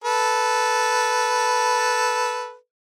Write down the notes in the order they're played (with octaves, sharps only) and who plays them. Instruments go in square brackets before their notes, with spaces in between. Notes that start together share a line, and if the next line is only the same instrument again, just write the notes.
[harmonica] A4 B4